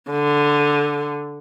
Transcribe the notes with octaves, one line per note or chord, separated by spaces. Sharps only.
D3